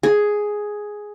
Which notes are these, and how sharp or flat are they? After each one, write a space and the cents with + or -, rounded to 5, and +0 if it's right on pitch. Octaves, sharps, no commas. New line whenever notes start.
G#4 +5